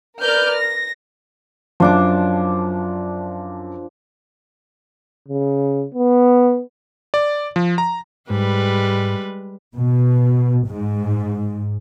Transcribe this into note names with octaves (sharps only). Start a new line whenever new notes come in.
A#4 B4 D5 F6 G6
A#6
F#2 F3 D4 D6
C#3
B3
D5
F3
A#5
G#2 G3 G#3 B4
B2
G#2